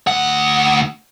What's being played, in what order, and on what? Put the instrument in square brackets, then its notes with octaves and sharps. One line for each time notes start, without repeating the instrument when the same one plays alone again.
[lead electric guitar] D2 F#5